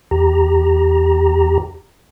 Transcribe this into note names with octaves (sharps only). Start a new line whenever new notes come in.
E2 G4 A#5